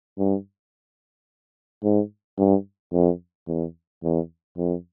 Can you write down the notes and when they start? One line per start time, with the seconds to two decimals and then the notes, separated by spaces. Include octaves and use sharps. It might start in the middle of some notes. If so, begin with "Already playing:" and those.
0.18 G2
1.83 G#2
2.38 G2
2.93 F2
3.48 E2
4.03 E2
4.57 F2